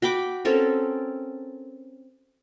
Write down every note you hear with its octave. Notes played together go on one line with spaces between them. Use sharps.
F#4 G5 B5 D6
C4 C#4 A4 A#4